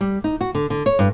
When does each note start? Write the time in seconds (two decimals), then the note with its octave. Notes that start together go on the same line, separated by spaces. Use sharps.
0.01 G3
0.24 D#4
0.41 F#4
0.55 D3
0.70 D3
0.86 C#5
0.99 G2